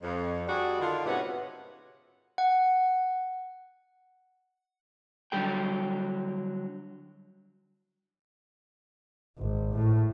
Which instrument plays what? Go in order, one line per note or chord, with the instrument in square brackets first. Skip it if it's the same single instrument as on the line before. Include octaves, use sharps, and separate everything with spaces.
[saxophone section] F2
G3 D4 F#4 G#4 D5
D3 D#3 F4
G#2 C3 B3 C#4 F#4
[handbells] F#5
[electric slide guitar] D3 F#3 G3 G#4 G5
[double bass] G#1
A2